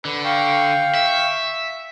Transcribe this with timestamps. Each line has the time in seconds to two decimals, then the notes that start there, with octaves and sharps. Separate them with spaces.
0.05 D3 B4 F#5
0.24 F5 G5 C#6
0.95 E5